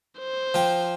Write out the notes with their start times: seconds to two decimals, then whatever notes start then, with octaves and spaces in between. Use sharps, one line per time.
0.19 C5
0.54 F3 G5